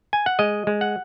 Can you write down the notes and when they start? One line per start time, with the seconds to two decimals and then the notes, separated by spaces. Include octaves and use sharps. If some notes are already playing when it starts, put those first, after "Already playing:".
0.13 G#5
0.26 F#5
0.39 G#3 D#5
0.67 G#3
0.81 F#5